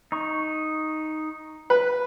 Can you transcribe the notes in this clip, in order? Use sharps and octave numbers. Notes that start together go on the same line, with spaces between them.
D#4 C#6
B4